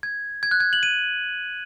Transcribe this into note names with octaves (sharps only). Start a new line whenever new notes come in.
G#6
G#6
F#6
G#6
F#7
D#7